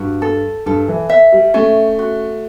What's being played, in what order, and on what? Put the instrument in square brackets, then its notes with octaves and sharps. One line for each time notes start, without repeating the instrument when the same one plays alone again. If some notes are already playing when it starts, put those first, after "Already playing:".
Already playing: [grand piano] G2 [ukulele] F#4
[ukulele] A4
[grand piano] G2 [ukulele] A4
[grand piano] E3
[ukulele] E5
[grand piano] G3
[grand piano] A3 [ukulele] C#4
[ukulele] F#4